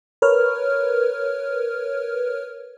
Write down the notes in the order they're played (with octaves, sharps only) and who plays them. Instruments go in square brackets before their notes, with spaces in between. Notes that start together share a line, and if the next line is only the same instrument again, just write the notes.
[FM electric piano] A#4 B4 C#5 F6